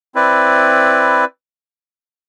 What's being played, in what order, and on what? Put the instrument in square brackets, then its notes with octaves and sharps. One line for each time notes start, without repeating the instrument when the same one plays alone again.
[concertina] C4 E4 B4 D5